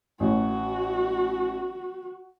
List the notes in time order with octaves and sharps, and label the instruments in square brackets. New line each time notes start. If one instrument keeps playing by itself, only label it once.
[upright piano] A1 [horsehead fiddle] F#4